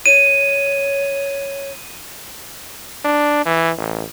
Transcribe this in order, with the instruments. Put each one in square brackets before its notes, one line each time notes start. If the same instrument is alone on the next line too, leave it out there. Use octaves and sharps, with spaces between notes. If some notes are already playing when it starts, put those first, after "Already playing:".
[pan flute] C#5 [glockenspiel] D#7
[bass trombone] D4
E3
A1